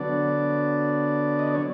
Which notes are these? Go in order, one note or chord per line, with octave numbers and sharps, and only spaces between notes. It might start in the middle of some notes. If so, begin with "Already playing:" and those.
Already playing: D3 F#3 B3 D4 D5
D#5
D5
C#5